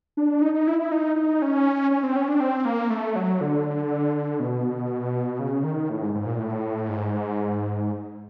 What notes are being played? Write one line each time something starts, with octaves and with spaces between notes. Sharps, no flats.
D4
D#4
D#4
E4
E4
D#4
D#4
C#4
C#4
C4
C#4
D4
C4
A#3
A3
F#3
D3
B2
C#3
D#3
A2
G#2
G#2
A#2
A2
G#2